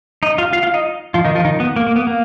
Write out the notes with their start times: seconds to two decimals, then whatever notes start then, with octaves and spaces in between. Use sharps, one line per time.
0.23 D#4 D#5
0.38 F4 F5
0.53 F4 F5
0.63 F4 F5
0.74 D#4 D#5
1.14 F3 F4
1.25 D#3 D#4
1.35 F3 F4
1.45 D#3 D#4
1.60 B3
1.76 A#3
1.87 A#3
1.96 B3
2.07 A#3